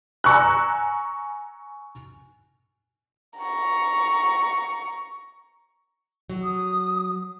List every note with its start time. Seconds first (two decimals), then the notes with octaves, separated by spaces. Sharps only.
0.24 G#5 A#5 C#6 E6 F#6
3.38 A#5 C#6
6.30 F#3
6.44 D#6